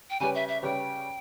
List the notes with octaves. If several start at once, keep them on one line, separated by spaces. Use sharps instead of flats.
G5
C#3 G3 C#4 G4 B4 G#5
E5
E5
C#3 G3 C#4 G4 B4 G5